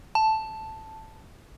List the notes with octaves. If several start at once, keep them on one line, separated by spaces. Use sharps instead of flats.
A5